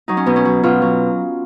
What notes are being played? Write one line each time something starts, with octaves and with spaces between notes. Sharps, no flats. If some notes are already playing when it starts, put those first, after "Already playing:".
F#3 D#4
C#4
B2 B3
C#4
F#3
B2 F4
F#3